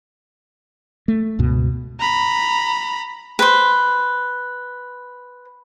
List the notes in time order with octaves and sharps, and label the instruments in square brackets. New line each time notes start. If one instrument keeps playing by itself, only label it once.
[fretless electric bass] A3
C#2 G2 B2
[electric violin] A#5 B5
[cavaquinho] B4 C5